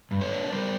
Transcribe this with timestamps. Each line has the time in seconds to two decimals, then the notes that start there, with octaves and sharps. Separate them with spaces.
0.11 G2
0.21 B4 C#5
0.32 D4
0.46 B4
0.52 G3 A#4 C5